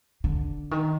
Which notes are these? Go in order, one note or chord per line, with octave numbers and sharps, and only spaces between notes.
D3
D#3